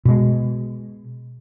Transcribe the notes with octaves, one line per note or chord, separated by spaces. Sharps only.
B2 G#3